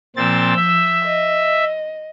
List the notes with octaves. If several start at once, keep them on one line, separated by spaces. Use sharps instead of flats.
A#2 F3 C4 E6 G6 A6
E5
D#5